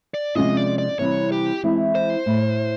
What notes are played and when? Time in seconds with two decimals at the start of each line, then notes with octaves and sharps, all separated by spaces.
0.14 D5
0.35 C3 F3 G#3 C#4 F4 D#5
0.57 D5
0.78 D5
0.99 C3 E3 G3 C4 C#5
1.32 G4
1.63 E3 G#3 C4 E4
1.95 C5
2.26 A2